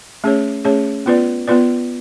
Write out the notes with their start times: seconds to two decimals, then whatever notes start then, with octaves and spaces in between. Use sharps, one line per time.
0.24 A3 C#4 G#4 C#5
0.65 A3 C#4 G#4 C#5
1.06 B3 F4 B4 D5
1.48 B3 F4 B4 D5